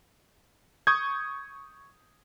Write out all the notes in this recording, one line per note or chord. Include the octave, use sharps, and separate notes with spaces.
C#6 D#6 G6 G#6